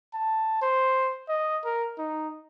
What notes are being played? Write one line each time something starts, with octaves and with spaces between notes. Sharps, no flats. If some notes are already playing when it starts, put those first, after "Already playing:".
A5
C5
D#5
A#4
D#4